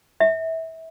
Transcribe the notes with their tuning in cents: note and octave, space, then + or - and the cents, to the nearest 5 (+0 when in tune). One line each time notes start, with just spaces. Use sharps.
E5 -25